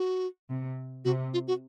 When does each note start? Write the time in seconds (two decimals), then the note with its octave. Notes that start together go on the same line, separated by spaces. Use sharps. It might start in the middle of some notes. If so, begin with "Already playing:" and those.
Already playing: F#4
0.49 C3
1.05 C3 F#4
1.34 F4
1.47 F#4